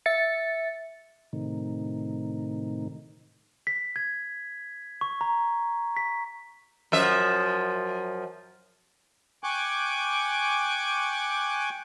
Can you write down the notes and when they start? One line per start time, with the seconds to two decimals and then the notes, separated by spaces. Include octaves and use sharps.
0.06 E5 A6 C#7
1.33 A2 C3 D#3
3.67 B6
3.96 G#6
5.01 C#6
5.21 A#5
5.96 B6
6.92 F#2 F3 E5
9.44 G5 G#5 C#6 D6 F#6